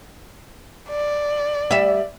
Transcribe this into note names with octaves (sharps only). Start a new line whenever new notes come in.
D5
G3 E5